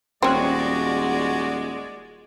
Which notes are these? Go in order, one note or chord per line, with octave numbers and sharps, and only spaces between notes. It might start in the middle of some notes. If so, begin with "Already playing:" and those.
D#1 G#3 C4 C#4 F#4 D5